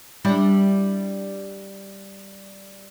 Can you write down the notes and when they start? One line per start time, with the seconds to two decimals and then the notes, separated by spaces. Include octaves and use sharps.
0.25 G3 D4 E4